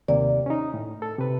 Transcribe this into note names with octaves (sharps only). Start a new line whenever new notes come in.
D#2 C3 A#3 D5
C#4 D#4
A2
A4
C3 B4